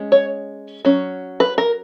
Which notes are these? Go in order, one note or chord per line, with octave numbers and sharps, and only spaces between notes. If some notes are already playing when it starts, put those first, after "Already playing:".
Already playing: G#3 C#4
C#5
F#3 C#4
B4
A#4